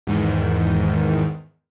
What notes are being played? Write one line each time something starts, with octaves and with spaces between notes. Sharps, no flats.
E2 G#2 D#3